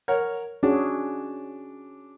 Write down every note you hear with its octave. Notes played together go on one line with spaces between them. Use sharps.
A#4 C#5 F#5
C#4 D4 F#4 G#4